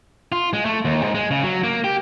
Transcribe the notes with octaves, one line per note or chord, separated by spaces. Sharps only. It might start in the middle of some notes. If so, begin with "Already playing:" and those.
F4
G#3
A3
D#2
G#2
G#3
C#3
F#3
A#3
G4